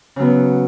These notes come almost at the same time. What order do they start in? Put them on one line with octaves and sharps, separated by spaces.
C#3 F#3 B3